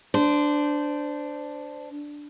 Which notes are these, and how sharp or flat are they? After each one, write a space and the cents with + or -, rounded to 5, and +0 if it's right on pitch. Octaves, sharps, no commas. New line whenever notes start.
D4 +0 C5 -20